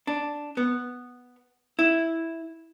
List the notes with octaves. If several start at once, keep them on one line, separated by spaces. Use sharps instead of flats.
D4
B3
E4